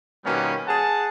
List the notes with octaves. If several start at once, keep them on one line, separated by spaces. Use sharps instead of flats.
B2 D#3 G3 A#3 B3 C#4
G#4 F#5 A5